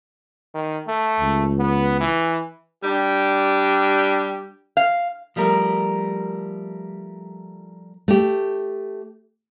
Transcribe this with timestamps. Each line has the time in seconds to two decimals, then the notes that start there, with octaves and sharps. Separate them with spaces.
0.55 D#3
0.88 A3
1.20 C#2
1.59 B3
2.00 E3
2.83 G3 D4 G4
4.77 F5
5.36 F3 G3 A3 A#4
8.08 A3 G4